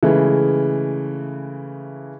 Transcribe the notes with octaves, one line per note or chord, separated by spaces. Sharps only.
C#3 E3 G#3 A3